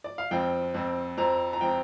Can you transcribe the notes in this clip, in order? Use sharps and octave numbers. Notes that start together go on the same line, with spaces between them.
D5
F5
F2 F3 C4 G5
F2 F3 C4
F2 F3 C4 A#5
A#5
F3 C4 G5